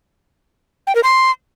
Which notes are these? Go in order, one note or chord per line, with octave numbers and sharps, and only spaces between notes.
G5
A#4
C6